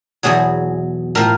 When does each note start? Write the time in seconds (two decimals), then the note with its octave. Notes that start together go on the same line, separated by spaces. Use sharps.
0.23 E2 B2 F#3 G#4
1.15 A2 F3 A#4